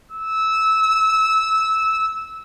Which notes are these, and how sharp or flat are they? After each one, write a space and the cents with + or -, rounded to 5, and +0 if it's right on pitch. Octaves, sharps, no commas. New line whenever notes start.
E6 -15